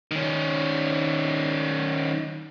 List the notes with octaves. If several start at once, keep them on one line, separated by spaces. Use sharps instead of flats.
D#3 C#4